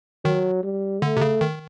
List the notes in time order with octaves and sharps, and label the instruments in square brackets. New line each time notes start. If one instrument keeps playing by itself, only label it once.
[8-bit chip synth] D#3 [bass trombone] F#3
[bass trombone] G3
[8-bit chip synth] D3 [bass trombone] A3
[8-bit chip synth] C3
C#3
D#3